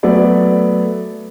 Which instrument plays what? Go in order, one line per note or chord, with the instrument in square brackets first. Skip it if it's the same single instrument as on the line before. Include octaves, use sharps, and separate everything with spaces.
[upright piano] F#3 A3 B3 D5